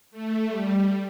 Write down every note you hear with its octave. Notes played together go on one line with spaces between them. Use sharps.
A3
G3